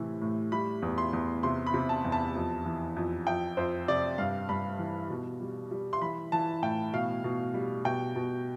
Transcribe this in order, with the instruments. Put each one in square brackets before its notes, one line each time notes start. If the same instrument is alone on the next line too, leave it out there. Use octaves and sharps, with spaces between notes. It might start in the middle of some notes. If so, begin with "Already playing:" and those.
Already playing: [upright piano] A2 C3 E3
A2
G3 B5
E2
C6
E2
C3 C6
B5
C3
A5
E2
A5
F2
E3
F2
F2 G5
F2 C5
C3 D5
G2 F5
G2 B5
E3
B2
G3
G3
C6
E3 B5
E3 A5
A2 G5
B2 F5
B2
G3
B2 G5
B2